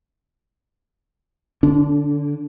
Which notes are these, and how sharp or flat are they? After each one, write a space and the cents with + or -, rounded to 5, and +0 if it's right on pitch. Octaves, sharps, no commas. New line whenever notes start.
D3 +0 D4 -35